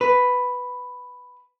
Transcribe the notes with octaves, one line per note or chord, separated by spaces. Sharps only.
B4